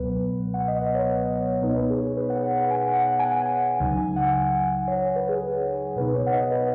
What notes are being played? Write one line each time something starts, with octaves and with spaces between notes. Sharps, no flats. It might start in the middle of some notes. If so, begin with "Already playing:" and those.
Already playing: C#2 B2 F#3 B3 B4
F#5
D#5
B4
C#5
D#5
B2 B3 D#4 B4
C#5
B4
G#4
B4
F#5
F#5
F#5
G#5
F#5
F#5
G#5
F#5
F#5
C#2 C#3 F#3 D#4 G#5
G#5
F#5
F#5
F#5
C#5
C#5
B4
G#4
G#4
B2 B3 D#4 B4
C#5
F#5
D#5
B4